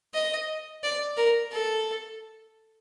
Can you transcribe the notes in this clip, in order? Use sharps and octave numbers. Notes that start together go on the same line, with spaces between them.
D#5
D5
A#4
A4